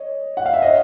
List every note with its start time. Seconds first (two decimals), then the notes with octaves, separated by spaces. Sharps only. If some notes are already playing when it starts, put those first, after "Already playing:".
Already playing: C#5 D#5
0.37 F#5
0.46 F5
0.54 E5
0.62 C#5 D#5